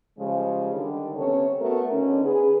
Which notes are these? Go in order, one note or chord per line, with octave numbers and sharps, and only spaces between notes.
C#3 F3 G3 G#3
D3 D#3 G3
C3 B3 C#4 A4 C#5
A3 B3 F#4 A#4
D3 C#4 D#4
G#4 B4